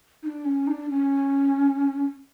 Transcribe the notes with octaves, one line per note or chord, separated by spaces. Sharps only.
D#4
D4
C#4
D#4
D4
C#4